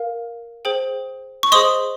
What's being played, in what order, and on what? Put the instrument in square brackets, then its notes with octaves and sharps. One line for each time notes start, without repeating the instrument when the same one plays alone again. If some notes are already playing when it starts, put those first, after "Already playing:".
Already playing: [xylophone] A#4 F5
G#4 C5 G5
C#6
G#4 C5 D#5 C6 D#6